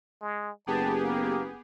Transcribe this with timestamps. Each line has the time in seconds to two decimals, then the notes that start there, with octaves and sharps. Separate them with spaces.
0.21 G#3
0.67 F#1 B3 G4 G#4 A5
1.04 A#3